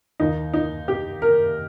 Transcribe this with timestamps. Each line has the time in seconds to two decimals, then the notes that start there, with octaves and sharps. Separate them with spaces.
0.20 D#2 D#3 D#4
0.53 D#4
0.88 G4
1.22 A#4